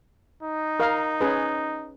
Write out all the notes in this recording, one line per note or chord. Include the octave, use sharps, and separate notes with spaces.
D#4
A#4 F5
C#4 G#4 B4